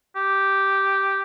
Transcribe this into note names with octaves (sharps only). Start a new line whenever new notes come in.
G4